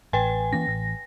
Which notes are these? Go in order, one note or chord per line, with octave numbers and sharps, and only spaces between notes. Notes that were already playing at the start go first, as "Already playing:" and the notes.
A1 B4 G5 G#5
E3 A#3 C#4 A#6
A1